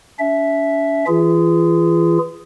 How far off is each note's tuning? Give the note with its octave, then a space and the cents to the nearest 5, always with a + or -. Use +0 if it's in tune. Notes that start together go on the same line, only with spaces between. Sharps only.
C#4 +45 E5 +0
E3 +0 F4 -35 G#4 +0